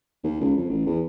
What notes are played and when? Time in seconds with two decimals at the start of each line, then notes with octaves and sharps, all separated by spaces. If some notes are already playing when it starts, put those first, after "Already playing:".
0.24 D#2
0.41 C#2
0.56 F2
0.69 A1
0.86 E2